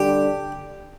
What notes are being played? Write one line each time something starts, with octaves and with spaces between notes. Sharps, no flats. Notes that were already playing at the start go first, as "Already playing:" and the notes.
Already playing: D3 G3 D4 G4